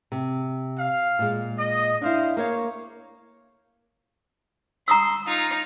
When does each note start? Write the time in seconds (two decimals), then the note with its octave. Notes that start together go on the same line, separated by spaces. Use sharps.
0.12 C3
0.77 F5
1.19 A#2 G#3
1.57 D#5
2.01 D4 E4 C5 F5
2.37 A#3 A#4 C#5 F5
4.88 A#5 C6 D#6 E6
5.27 D#4 F4